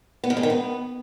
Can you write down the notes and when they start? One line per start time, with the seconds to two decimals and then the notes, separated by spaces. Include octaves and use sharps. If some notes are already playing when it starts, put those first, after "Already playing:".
0.24 B3
0.30 D#3
0.37 G#3
0.43 D#3
0.50 B3